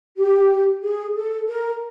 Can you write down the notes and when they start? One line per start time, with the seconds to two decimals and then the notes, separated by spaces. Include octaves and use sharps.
0.17 G4
0.83 G#4
1.15 A4
1.48 A#4